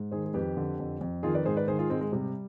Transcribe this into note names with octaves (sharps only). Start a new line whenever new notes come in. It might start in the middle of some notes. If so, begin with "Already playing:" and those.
Already playing: G#2
D#3 G#4 C5
G#4
F2 G4 B4
D3
F2
F2
D#3 F4 G#4
B4 D5
G#2 G#4 C5
B4 D5
D#3 G#4 C5
F4 G#4
G#2 G#3 C4
G#3
C3 G3